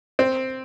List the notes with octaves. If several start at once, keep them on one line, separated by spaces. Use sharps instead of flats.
C4